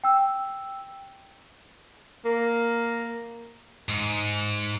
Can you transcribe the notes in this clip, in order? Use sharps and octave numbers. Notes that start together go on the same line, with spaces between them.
G5 E6
A#3
G#2